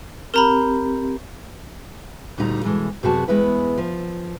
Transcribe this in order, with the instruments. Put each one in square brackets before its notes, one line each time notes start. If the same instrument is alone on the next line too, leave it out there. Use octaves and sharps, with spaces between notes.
[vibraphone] C4 G4 [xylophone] A#4 A#5 B5
[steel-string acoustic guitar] D2 A#2 G3 D#4 A5 A#5
B2 E3 G#3 A4
F#2 C3 B3 F#4 G#4 A5
E2 G#3 B3 E4 B4
F3